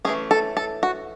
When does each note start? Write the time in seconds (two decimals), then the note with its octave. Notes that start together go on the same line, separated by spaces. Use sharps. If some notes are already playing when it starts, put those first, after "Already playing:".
0.05 E3 A3 C#4 G#4
0.31 A4
0.57 A4
0.83 F#4